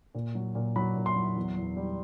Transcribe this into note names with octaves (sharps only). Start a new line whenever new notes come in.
A#2
F#3
A#2
F#3 B5
A#2
C6
F#3
E2
E2
G3